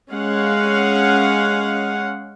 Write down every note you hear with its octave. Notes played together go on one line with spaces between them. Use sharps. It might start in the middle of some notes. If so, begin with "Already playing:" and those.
G#3 C#4 F5 F#5